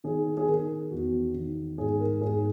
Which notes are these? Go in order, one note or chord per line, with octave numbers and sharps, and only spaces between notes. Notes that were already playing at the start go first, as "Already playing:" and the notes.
D#3 G#4
G#4
D#3 A#4
E2 F#4
D#3
G#2 G#4
A#4
G#2 G#4